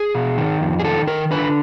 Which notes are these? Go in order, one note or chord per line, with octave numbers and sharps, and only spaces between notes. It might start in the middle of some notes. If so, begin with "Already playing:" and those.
Already playing: G#4
B2
D#3
F2
G#4
D#3 A4
D#3 A#4
D3 B4